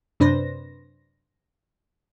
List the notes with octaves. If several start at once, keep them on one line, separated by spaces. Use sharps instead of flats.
F#2 C3 D4 B4 C5 A#6